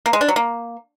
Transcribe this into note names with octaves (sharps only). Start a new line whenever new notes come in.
A#3
G#3
D4
F#3
A#3